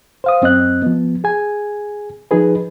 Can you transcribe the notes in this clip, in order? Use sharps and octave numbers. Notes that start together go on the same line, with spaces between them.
C5 F5 D#6
F#2 C4 D#5 F#6
F3 B3
G#4 G#5
F3 D#4 G#4 B4